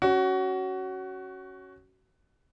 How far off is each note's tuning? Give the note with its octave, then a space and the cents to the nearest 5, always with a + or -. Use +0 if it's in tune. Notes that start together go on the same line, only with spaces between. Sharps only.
C#4 +0 F#4 +20